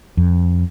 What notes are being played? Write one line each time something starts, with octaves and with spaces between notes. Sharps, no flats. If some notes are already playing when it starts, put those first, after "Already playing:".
F2